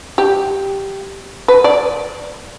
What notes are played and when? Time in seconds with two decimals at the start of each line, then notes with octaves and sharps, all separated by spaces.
0.18 G4
1.48 B4
1.64 D5